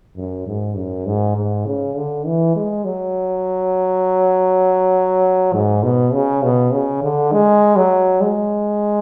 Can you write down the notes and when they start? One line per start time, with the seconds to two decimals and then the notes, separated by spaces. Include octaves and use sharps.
0.16 F#2
0.47 G#2
0.76 F#2
1.06 G#2
1.36 G#2
1.66 C#3
1.96 D3
2.26 E3
2.56 G#3
2.85 F#3
5.53 G#2
5.83 B2
6.13 C#3
6.43 B2
6.72 C#3
7.03 D3
7.32 G#3
7.76 F#3
8.21 G#3